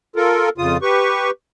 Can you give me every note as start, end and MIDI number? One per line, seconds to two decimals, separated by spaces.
0.16 0.49 65
0.16 0.49 69
0.16 0.49 70
0.58 0.77 41
0.58 0.77 49
0.58 0.77 65
0.58 0.77 87
0.82 1.31 67
0.82 1.31 71
0.82 1.31 85